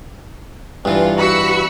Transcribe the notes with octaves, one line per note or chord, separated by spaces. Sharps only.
G2 E3 F4
F#4 B5 E6 C#7